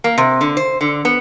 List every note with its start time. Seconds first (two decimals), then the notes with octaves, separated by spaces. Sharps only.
0.04 A#3
0.18 C3
0.41 D3
0.57 C5
0.81 D3
1.05 B3